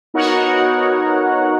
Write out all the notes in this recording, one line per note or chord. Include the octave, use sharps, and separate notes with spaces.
B3 D#4 F#4 A#4 C#5 F#5